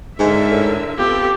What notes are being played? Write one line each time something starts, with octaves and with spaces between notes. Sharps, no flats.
G#2 D3 G#3 A#4 E5
A2
B3 C4 F4 G4 A4